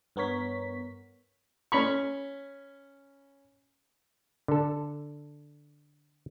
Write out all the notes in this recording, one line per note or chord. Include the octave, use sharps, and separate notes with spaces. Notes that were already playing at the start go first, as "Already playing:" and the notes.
G2 B3 A#4 C#5 B6
C#4 B5 C#6
D3 A4